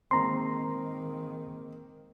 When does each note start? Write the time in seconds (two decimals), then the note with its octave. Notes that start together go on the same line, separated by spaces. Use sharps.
0.11 D#3 G#3 A#3 C4 A#5 C6